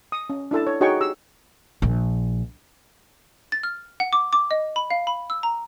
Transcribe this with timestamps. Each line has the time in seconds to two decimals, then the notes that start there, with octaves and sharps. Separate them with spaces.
0.12 D#6
0.30 C#4
0.51 D4 E4 A4 A5
0.67 C#5
0.81 D#4 F#4 G#4 C#5 G5 C#6
1.01 G4 E6
1.82 A#1
3.52 A6
3.63 F6
4.00 F#5
4.13 D6
4.33 D6
4.51 D#5
4.76 B5
4.90 F5
5.07 B5
5.30 E6
5.43 A#5